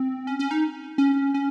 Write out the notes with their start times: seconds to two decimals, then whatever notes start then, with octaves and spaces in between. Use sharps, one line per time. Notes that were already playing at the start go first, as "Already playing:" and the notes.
Already playing: C4
0.27 C#4
0.39 C#4
0.51 D#4
0.98 C#4
1.34 C#4